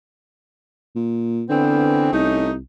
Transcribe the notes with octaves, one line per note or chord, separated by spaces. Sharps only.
A#2
D3 E3 B3 C4
C2 A3 C#4 D#4